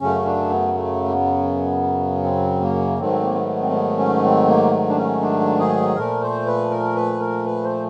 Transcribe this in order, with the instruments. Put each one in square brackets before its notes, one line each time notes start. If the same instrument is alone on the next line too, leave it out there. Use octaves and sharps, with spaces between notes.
[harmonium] F#2 C#3 F#3 A3 C#4
D4
B3
A3
A#3
B3
C4
A#3
G#2 D#3 F#3 A3 C4
A#3
B3
C4
B3
C#4
C4
A#3
D4
C#4
D4
G#4
A#2 F3 A3 A#4
C5
B4
A#4
B4
A#4
B4
C5